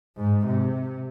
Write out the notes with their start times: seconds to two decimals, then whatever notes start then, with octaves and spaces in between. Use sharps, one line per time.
0.18 G#2
0.47 C3